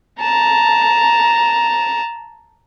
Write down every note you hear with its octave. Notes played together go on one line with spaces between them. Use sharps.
A5 A#5